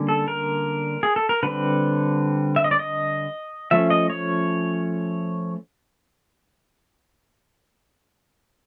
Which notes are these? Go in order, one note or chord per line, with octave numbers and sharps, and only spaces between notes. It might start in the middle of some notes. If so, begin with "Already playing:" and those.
Already playing: D3 G3 A#3 C#4
A4
A#4
G#4
A4
A#4
D3 G3 C4 B4
E5
D#5
D5
D#5
F3 A3 C#4 E5
D#5
C#5